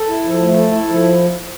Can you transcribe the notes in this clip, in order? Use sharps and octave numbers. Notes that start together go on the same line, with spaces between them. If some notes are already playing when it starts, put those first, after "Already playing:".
Already playing: A4
E4
F3
A3
A4
E4
F3